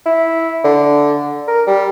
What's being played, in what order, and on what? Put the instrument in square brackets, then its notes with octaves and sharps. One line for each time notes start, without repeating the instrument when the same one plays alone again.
[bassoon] E4
D3
A#4
G3